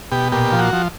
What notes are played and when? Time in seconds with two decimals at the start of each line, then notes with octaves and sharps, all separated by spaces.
0.12 B2 G4
0.32 A#2 G4
0.52 F3
0.59 F#4
0.73 F3